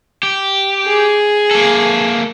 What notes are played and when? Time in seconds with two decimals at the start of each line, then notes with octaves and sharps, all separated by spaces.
0.23 G4
0.87 G#4
1.51 A#3 A4